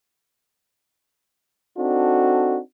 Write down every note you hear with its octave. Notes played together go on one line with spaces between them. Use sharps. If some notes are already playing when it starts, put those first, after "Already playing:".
C4 D4 D#4 F#4 A4